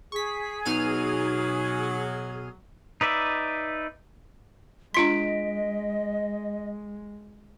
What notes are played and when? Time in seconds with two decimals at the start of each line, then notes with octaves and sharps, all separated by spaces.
0.12 G#4 C#6 B6
0.66 B2 F#3 D#4 F6 D#7
3.01 D#4 B4 D5 E5
4.94 G#3 D4 F4 D#5 C6 B6 D7